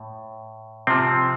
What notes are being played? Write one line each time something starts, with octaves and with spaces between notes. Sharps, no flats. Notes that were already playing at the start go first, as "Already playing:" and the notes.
Already playing: A2
C3 F3 C4